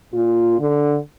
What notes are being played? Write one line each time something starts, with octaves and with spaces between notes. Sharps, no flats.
A#2 F4
D3